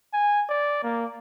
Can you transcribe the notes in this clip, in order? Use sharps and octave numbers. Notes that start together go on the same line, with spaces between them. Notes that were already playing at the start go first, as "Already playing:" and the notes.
G#5
D5
A#3